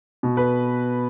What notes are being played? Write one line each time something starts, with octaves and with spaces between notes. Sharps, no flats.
B2
B4